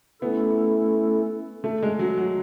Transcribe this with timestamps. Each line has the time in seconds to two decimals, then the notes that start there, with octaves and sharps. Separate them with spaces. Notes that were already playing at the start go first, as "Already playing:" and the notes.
0.22 A3 B3 C#4 E4 A4
1.64 A3
1.83 G#3
1.99 F#3
2.18 F#3